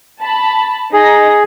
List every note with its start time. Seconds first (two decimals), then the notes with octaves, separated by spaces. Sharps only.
0.20 A5 B5
0.93 D#4 G#4 A#6